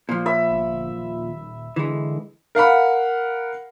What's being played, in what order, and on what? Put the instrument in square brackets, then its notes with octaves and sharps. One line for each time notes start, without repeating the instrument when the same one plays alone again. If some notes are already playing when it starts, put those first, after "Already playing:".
[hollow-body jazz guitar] A#2 F3
[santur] E5 B5
[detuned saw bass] G1
D#1
[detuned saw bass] D3 [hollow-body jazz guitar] E3 G#3
[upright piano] A#4 F5 F#5 B5